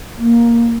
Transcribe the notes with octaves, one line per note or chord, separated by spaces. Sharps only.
A#3